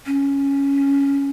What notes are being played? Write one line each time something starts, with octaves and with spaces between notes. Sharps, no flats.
C#4